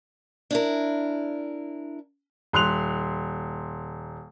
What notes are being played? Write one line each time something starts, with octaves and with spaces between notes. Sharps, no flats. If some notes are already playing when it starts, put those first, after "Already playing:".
D4 E4 A#4
D#1 C6 F#6 F7